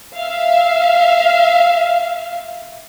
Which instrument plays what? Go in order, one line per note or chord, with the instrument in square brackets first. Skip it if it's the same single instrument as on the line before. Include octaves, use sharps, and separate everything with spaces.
[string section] E5 F5